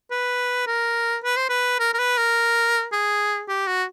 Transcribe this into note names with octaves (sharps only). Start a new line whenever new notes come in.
B4
A#4
B4
C5
B4
A#4
A#4
B4
A#4
G#4
G4
F#4